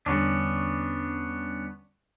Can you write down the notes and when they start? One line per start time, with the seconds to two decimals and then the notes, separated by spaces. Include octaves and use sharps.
0.06 E2 D3 G3 B3 C#4 D4